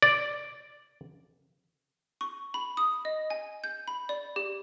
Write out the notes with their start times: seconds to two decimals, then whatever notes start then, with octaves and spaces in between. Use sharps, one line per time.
0.02 D5
2.21 C#6
2.54 B5
2.77 D#6
3.05 D#5
3.30 G#5
3.64 G6
3.88 B5
4.09 D5
4.36 G4